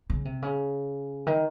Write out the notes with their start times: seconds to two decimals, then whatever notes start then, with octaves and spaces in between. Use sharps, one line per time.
0.10 C#3
0.25 C3
0.42 C#3
1.27 D#3